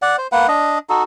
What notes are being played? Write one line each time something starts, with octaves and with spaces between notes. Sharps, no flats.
D5 F#5
C5
A#3 B4 F#5
D4 D#5
D#4 F#4 A4